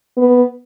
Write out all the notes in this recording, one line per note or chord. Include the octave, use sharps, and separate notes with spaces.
B3